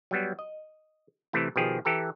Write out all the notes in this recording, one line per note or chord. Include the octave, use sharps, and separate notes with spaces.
F#3 G3 B3
D#5
C3 E3 A3 E4
B2 D#3 F3 G4 G#4
E3 G4 A4 A#5